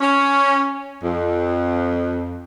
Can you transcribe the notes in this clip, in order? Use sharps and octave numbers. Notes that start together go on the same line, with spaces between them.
C#4
F2